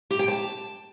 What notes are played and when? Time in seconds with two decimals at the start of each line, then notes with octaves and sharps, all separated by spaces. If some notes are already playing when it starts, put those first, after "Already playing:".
0.11 G4
0.19 G5
0.28 A5